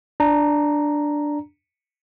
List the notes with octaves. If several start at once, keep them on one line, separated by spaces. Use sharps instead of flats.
D4 A#5